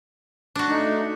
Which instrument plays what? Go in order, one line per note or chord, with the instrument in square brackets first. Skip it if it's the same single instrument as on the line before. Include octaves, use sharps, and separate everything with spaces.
[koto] D4 F#4
[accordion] A3 D#4